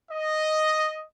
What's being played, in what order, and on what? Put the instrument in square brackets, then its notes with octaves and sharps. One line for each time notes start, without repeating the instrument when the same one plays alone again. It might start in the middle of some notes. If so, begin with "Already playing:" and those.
[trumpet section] D#5